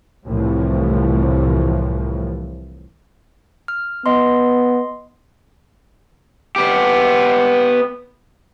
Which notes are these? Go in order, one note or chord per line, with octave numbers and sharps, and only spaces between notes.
C2 A2 E3 F3
F6
B3 D#5 C6
B3 G4